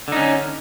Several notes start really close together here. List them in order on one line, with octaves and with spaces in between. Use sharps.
D3 D#4 C#4